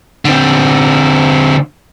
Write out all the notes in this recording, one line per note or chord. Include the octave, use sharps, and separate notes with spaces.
D3 C4